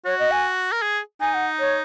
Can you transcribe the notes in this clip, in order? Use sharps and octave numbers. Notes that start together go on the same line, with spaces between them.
F#4 C#5
D#5
G#5
A#4
G#4
D#4 G#5
F#5
C#5